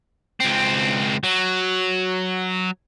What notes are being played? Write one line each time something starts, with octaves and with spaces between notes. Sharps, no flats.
C#2 C4
F#3